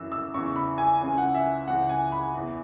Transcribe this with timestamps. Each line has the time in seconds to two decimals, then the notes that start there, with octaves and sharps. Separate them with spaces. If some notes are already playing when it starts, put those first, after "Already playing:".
Already playing: F#2 E3 E6
0.12 E6
0.34 E2 C#3 E3 C#6
0.56 B5
0.78 G#5
1.01 C#2 C#3 E3 G#5
1.18 F#5
1.35 E5
1.67 C#2 C#3 E3 F#5
1.89 G#5
2.12 B5
2.34 E2 E3